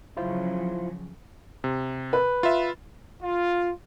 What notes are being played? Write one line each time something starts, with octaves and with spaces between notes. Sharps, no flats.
C#3 F3 F#3 E4 F4 C5
C3
B4
F4 E5
F4